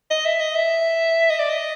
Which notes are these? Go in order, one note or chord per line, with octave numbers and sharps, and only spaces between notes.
D#5
E5
D#5
E5
D#5
D5
D#5